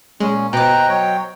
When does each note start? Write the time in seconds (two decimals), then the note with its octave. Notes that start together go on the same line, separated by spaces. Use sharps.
0.20 A#2 G#3 C#4
0.53 B2 C5 D#5 G5 A#5 D6 F#6
0.89 F#3 C#5 G5